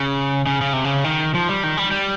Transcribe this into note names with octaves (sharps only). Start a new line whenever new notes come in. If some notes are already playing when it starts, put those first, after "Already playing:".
Already playing: C#3
C#3
C#3
C3
C#3
D#3
F3
G3
D#3
G3
G3